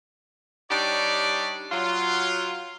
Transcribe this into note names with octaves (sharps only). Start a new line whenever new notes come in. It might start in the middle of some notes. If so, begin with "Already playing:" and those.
G3 D4 D#4 G4 C#5 D5
F#3 F4